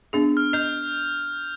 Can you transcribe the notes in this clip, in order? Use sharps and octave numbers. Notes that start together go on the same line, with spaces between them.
B3 D4 G#4
F6
D#5 G6 F7